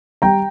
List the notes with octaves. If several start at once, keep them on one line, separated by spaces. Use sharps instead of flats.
G3 G5 A#5